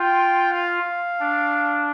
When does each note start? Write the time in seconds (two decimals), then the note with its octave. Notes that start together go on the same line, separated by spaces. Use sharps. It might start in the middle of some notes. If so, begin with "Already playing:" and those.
Already playing: F4 G5
0.52 F5
1.20 D4